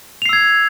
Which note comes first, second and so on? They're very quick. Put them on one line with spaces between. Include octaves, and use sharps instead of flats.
F7 C7 E6 G#6